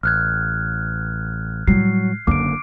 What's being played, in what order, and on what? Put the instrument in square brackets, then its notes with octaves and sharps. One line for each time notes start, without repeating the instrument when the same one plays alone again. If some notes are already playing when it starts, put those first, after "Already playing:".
[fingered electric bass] A1 [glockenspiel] F6 F#6 G#6
[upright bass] A2 G3 [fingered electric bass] F#3 [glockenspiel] C7
[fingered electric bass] F#1 D3 A#3 [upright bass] F#2 F#3 [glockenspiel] D6 D7